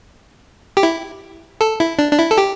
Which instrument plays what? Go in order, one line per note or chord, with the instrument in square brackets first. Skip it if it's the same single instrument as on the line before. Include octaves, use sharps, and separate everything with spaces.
[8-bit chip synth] G4
E4
A4
E4
D4
D4
E4
A4
G4